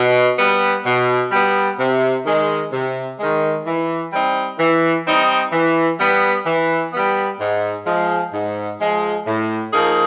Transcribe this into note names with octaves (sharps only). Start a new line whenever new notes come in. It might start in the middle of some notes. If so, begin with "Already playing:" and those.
Already playing: B2
G3 B3
B2
G3 B3
C3
D#3 G#3
C3
D#3 G#3
E3
G3 C4 D#4
E3
G3 C4 D#4
E3
G3 B3
E3
G3 B3
G#2
F3 G#3
G#2
F3 G#3
A2
F3 A#3 D#4 G#4